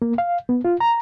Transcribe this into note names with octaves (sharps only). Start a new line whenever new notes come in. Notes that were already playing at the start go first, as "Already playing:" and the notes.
A#3
F5
B3
F4
A#5